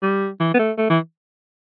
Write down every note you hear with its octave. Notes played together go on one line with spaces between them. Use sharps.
G3
E3
B3
A3
A3
E3